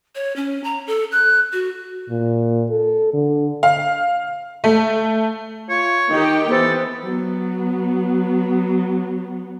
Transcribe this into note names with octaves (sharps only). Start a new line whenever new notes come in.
C#5
C#4
A#5
A4
F#6
F#4
A#2
A4
D3
F5
A3
F4 C#5
D#3 D#4 G4 G5
E3 B3 A4 C5
F#3 B3